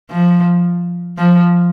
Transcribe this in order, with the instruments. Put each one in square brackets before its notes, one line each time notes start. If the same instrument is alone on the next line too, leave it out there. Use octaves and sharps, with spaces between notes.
[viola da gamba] F3
F3